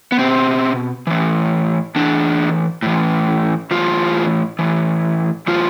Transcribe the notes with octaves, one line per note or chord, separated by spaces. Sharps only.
B3
B2 C4
A2 E3
A2 E3 D4
A2 E3
A2 E3 F4
A2 E3
A2 E3 F4